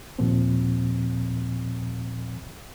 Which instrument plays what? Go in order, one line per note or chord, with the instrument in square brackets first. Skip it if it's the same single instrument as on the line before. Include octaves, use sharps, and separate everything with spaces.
[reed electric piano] D#2 A#2 F3 C4